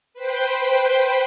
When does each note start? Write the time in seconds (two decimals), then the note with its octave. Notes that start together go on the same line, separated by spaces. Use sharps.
0.14 B4 C5 G5